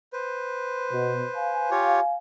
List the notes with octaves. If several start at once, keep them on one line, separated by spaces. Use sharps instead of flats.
B4 C5
B2
F5 G#5
F4 G4 C#5